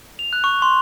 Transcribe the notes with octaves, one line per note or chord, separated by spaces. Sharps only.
F7
F#6
C#6
C6